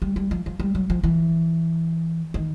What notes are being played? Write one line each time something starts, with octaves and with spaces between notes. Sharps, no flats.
G3
G3
F3
F3
G3
F#3
F3
E3
D#3